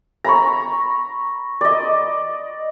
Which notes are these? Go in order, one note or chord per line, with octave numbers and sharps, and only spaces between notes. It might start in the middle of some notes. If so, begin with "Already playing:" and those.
A#5 B5 C#6
D5 D#5